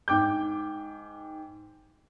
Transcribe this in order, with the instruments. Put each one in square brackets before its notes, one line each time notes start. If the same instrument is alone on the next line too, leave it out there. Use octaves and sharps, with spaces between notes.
[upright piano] G#2 G5 D6 G6